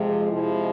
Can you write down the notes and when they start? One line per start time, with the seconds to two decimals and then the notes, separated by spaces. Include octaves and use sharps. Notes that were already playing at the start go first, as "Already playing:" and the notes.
Already playing: F2 C3 F3 G#3
0.31 C3 F3 G#3 E4